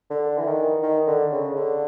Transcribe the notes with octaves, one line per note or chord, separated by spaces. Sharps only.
D3
E3
D#3
D#3
D3
C#3
D3